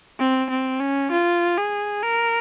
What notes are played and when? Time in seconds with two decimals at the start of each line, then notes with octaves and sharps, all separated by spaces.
0.19 C4
0.50 C4
0.80 C#4
1.11 F4
1.57 G#4
2.03 A#4